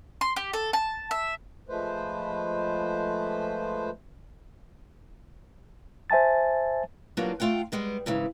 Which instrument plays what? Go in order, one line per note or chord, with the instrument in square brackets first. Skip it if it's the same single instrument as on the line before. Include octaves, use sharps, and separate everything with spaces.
[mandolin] C6
G4
A4
A5
E5
[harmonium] F3 G#3 A3 B4 C5
[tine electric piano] C5 E5 G#5 A5 A6
[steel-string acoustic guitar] F#3 G3 A#3 B3 D4 F4
A3 F4 F#5 G5
G3 G#3 B3
G#2 C#3 E3